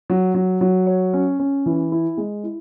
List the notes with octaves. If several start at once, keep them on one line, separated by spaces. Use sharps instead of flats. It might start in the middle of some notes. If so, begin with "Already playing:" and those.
F#3
F#3
F#3
C#5
C#4
C#4
E3
E4
G#3
E4